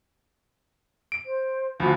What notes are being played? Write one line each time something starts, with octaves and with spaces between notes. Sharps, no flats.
D7
C5
D2 F3 F#4 F5 B5